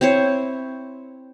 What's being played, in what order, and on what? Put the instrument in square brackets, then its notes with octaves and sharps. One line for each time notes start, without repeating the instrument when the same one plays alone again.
[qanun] C4 E4 C5 C#5